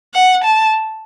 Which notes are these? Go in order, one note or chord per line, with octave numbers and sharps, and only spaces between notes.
F#5
A5